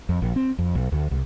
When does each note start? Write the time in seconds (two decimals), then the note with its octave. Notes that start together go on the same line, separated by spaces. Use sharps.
0.09 F2
0.22 A#1
0.36 C4
0.59 F2
0.75 B1
0.92 D2
1.11 C2